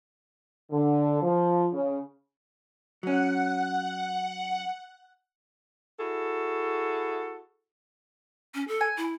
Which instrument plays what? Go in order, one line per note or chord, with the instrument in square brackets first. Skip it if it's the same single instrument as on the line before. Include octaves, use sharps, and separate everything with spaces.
[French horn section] D3
F3
C#3
[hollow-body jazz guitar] F#3 C#4 [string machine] F#5
[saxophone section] E4 F#4 G#4 A4
[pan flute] C#4
A4
[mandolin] G#5
[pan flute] E4